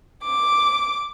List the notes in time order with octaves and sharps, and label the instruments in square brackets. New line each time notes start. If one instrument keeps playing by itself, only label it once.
[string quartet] D6